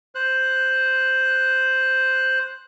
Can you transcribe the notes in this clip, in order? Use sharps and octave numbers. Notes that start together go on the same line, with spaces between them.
C5 F#6